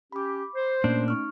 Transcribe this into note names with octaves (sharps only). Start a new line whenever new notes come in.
C#4 G4 B5 D6
C5
A#2 A3 A#3 C#4 D4 D7
D#4 C#6 F6